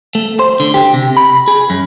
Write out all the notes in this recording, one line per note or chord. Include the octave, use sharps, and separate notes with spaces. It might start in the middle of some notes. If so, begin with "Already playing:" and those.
A3
C5
D3
G4
C3
B5
G#4
F#2